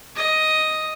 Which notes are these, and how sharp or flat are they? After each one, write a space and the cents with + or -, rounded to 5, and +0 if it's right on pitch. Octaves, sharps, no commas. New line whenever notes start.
D#5 +5